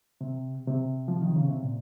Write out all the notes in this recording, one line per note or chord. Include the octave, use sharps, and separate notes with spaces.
C3
C3
F3
D#3
C#3
C3
A#2